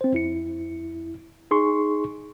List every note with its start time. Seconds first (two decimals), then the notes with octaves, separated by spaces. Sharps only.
0.01 C4 C5
0.12 F2 E4 C#7
1.51 D#4 G#4 C6 C#6